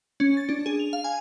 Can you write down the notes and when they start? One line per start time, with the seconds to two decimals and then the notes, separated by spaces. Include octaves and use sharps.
0.20 C#4
0.37 A6
0.49 D4
0.66 G#4
0.80 F7
0.93 F5
1.04 G#5